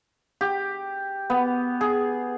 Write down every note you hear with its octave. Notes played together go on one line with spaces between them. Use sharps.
G4
B3
G#4